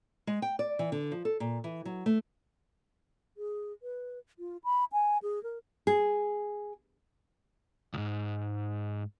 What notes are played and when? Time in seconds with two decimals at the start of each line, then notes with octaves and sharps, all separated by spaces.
0.27 G#3
0.42 G5
0.59 D5
0.79 E3
0.92 D3
1.12 F3
1.25 A4
1.40 A#2
1.64 E3
1.85 F#3
2.06 A3
3.37 G#4
3.83 B4
4.39 F4
4.64 B5
4.93 G#5
5.23 G#4
5.43 A#4
5.87 G#4
7.94 C#2 G#2